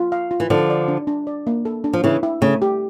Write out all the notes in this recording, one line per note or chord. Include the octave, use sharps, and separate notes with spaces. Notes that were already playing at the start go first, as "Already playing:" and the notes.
Already playing: F4
F5
F4
E3
D3 F3 D5
D5
D4
D4
D5
A#3
A4
D4
F3
C#3 E3 E4
E4
C#3 A3
G4